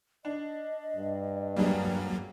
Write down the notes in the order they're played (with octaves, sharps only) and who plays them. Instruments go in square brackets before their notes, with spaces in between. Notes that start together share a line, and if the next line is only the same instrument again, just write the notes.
[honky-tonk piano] D4 [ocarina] D#5
[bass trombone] G2
[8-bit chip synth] F#2 F#3 A#3 [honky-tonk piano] G3 D4 G#4